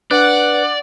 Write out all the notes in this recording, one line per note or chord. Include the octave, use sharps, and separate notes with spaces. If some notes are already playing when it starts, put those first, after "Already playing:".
D4 B4 D5 F#5 F#6